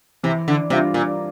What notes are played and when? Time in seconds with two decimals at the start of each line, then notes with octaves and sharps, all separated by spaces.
0.23 C3 E3
0.48 D3
0.70 C3 G3 D4 F4
0.94 A#2